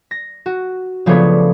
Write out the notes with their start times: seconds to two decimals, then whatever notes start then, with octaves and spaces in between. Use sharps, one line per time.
0.11 A#6
0.46 F#4
1.06 C#3 F3 A3 B3 D4 C#5